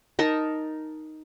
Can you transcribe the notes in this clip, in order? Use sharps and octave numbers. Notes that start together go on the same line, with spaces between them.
D#4 A#4 A5